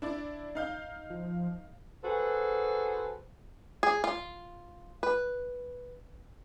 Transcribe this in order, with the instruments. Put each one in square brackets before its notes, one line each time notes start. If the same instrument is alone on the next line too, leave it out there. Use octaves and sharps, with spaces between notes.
[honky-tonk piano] D4 E4 D5
D#4 F5 G6
[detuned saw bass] F3
[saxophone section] F#4 G#4 A4 B4 C5
[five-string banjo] G#4
F4
B4